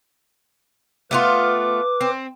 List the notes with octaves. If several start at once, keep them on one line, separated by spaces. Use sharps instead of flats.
A3 B3 F4 B4 D6
C4